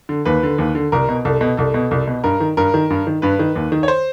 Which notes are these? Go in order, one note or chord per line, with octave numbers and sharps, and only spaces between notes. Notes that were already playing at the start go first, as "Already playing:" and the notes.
D3
D#2 B4
D3
D#2
D3
C2 A#4
B2
C2 A4
B2
C2 A4
B2
C2
B2
G2 A#4
D#3
G2 A#4
D#3
G2
D#3
G2 B4
D#3
D#2
D#3
C#5
C5